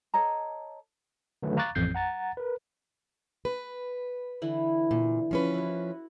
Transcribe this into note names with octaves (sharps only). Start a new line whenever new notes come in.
A4 C#5 D#5 A#5
D3 D#3 F#3 A3 A4 B4
F5 A#5 C#6 D6 F#6 A6
A1 F2 G6 C7
F#5 A#5 A6
A#4 B4
B4
D3 E3 E4
A#2
F3 C#4 B4
E4 F#4